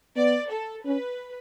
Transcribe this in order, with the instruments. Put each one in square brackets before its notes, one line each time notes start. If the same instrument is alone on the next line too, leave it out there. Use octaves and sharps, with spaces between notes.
[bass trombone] B3 [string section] D5
[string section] A4
[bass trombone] C#4 [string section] B4